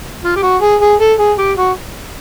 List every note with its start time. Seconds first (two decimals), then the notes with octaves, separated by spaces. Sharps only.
0.24 F4
0.36 G4
0.43 F#4
0.62 G#4
0.81 G#4
1.00 A4
1.19 G#4
1.38 G4
1.57 F#4